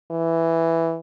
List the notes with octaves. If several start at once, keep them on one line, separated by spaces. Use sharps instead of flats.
E3